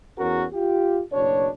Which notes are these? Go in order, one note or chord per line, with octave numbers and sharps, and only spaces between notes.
E2 C#4 F#4 A#4
F4 G4
F#1 B2 D4 C#5